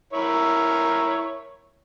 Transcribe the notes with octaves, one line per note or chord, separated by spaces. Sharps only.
E4 A#4 C#5